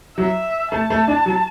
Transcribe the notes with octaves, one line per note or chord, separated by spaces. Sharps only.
F#3 E5
A3 A5
A3
D4
F#3